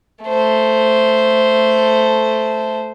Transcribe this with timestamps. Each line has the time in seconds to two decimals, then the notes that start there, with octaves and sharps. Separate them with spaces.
0.24 A3 C5